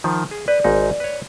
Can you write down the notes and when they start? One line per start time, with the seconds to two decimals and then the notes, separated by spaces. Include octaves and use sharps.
0.04 D#3 F3
0.31 G#4
0.48 B4 D5
0.64 G#1 G#2 D#4
1.00 B4 C#5